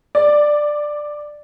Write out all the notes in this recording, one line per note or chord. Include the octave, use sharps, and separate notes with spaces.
D5